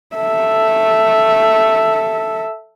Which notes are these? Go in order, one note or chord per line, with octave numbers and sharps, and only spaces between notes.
A4 E5